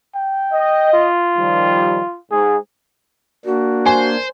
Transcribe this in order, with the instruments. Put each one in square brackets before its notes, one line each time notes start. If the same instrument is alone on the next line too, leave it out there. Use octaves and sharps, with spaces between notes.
[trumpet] G5
[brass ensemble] D#5
[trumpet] F4
[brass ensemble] D#3 F3 G3
[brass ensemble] G#2 [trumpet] G#4
[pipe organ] A#3 D4 [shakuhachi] F#4
[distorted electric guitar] C5 [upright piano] G#5